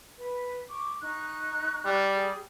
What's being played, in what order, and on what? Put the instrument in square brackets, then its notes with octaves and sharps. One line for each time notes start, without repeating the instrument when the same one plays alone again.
[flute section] B4
C#6 D6
D#4 C#6 F#6
[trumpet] G3
[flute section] G#4